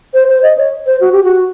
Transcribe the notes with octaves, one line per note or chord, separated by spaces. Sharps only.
C5
C5
D#5
C#5
C5
F#4
G4
F#4